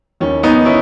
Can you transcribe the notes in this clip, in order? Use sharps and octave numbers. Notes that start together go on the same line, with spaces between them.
D#2 D#3 C#4
B3 D#4
C#4 E4